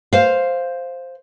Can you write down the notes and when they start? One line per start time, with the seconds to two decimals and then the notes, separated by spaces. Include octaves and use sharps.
0.13 C5 F5